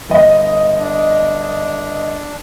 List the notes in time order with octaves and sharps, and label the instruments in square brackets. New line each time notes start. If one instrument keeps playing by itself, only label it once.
[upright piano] G1 D#5
[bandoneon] D4